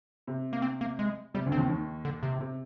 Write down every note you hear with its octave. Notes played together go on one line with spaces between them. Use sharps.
C3
A#3
C4
A#3
G#3
C3 G3
D2 D3
C4
D#2 D#3
D#2 D#3
D3
C3
C3